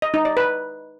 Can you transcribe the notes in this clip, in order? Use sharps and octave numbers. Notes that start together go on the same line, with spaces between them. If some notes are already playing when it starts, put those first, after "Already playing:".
D#5
D#4
D5
B4